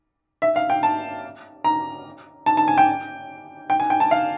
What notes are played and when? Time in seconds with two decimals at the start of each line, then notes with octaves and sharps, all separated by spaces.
0.42 E5
0.56 F5
0.70 G5
0.83 A5
1.64 A#5
2.46 A5
2.57 A5
2.68 G#5
2.78 G5
3.70 G5
3.80 G#5
3.90 G5
4.00 A5
4.11 F5